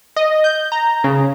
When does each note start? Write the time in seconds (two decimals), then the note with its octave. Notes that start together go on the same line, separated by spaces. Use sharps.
0.16 D#5
0.44 G6
0.72 A#5
1.04 C#3